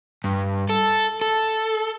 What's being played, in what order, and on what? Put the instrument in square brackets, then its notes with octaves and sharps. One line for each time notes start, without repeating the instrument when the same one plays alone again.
[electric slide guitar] G2
A4
A4